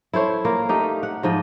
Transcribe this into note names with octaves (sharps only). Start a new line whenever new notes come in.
E4 A4 C5 C#5
A#3 F4
A3 D#4 G4
F#5
G#2 F3 D#5